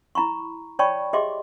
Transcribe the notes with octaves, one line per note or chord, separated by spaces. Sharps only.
E4 A#5 B5 C#6
C#5 D5 G5 A5 B5 C#6
G4 G#4 D#5 E5 C6 D6